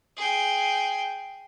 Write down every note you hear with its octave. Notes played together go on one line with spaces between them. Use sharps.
G#4 G5